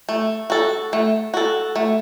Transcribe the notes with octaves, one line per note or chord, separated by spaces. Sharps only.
A3
F#4 A4
A3
F#4 A4
A3